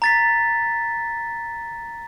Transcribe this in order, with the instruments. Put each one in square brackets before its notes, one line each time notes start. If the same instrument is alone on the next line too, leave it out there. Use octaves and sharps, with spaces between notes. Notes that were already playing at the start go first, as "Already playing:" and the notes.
[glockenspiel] A#5 A6 B6